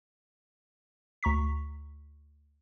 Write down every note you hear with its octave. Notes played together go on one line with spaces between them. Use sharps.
D2 A#5 C#6 B6